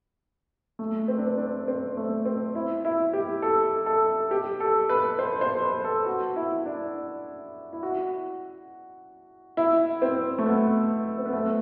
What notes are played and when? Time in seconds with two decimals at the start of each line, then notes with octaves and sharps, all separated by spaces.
0.79 A3
1.08 C4
1.18 D4
1.27 C4
1.38 D4
1.68 C4
1.97 A3
2.25 C4
2.55 E4
2.85 E4
3.13 G4
3.42 A4
3.86 A4
4.31 G4
4.60 A4
4.89 B4
5.19 C5
5.41 C5
5.63 B4
5.84 A4
6.06 F#4
6.36 E4
6.66 D4
7.73 E4
7.83 F#4
9.57 E4
10.02 C4
10.38 A3
10.46 B3
11.18 C4
11.26 B3
11.33 A3